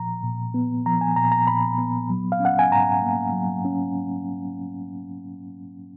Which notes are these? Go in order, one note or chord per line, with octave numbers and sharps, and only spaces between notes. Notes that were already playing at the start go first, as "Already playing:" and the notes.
Already playing: A#2 F3 A#5
A#2
B3
F3 A#5
G#5
A#2 A#5
A#5
A#2 B5
B3
F#3
F5
C#4
F#5
G#5
G#2 A#5
A#3
F#3
C#4